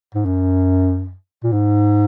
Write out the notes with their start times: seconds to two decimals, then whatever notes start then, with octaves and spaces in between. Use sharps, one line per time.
0.15 G#2
0.25 F#2
1.44 A#2
1.52 G#2